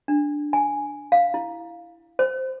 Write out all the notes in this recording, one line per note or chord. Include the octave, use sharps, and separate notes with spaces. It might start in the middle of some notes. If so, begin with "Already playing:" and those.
D4
G#5
F5
E4
C5